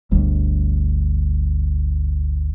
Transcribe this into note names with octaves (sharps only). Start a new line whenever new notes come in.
G1 D2 G3